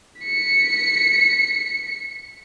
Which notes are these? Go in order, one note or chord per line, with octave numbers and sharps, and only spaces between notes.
B6 C#7